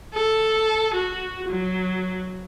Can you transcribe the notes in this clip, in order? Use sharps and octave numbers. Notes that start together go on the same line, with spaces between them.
A4
F#4
F#3